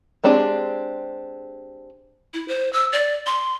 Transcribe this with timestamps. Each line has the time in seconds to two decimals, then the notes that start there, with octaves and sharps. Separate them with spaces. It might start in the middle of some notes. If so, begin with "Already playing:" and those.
0.24 G#3 C4 D4 G4 G#4
2.34 E4
2.48 C5
2.73 E6
2.93 D5
3.26 C6